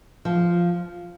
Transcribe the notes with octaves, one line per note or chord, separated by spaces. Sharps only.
F3